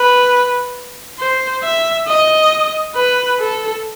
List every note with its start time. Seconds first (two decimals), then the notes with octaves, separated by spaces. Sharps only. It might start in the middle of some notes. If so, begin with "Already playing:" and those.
Already playing: B4
1.19 C5
1.63 E5
2.07 D#5
2.95 B4
3.39 A4